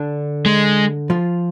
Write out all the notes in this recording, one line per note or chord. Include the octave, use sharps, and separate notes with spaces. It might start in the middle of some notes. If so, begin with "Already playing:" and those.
Already playing: D3 D4
G#3
F3 F4